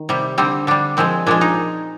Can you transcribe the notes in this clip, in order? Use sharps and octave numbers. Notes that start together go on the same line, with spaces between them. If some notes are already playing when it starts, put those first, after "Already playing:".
Already playing: D#3
C3 G3
D3 G3 C4
D3 G3 D4
A#2 F3 G#3 C4
A#2 F3 G#3 D4
D#4